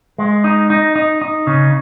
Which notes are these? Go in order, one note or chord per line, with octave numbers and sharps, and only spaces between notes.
G#3
D#4
D#4
D#4
D#4
C#3